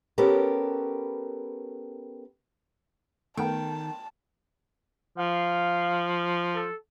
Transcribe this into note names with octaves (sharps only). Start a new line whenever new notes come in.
B3 C#4 G4 A4 A#4
D#3 A3 B3 G5 A5
F3 F5
A4